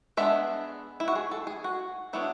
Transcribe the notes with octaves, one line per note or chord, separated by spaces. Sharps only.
G#3 B3 D4 E5
E4
F#4
G#4
A4
G#4
F#4
F#3 B3 D4 E4